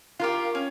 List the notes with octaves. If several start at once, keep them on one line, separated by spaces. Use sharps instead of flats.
F4 G4 A#4 F5
C#4